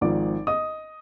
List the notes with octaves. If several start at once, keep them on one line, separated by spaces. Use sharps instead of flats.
G#1 G#2 F3 D5 D6
D#5 D#6